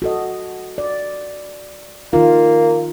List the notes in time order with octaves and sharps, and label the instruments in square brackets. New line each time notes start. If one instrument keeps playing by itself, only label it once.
[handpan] F#4 A4 D#5
D5
[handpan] D#3 D#4 F4 [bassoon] A#3